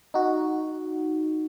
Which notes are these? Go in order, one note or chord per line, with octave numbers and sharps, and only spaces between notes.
D#4 F#4